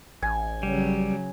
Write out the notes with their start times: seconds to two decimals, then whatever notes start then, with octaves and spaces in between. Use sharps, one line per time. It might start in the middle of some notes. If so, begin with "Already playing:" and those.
0.22 A1 G#5
0.63 C#3 F#3 G3